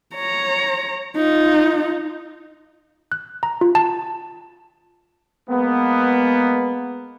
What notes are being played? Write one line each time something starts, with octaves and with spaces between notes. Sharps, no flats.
C#5 A#5
D#4 F4
F#6
A#5
F4
A5
G#3 A#3 B3